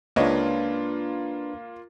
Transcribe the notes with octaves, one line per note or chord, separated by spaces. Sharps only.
C#2 A#3 D4 F4 B4 C#5 D#5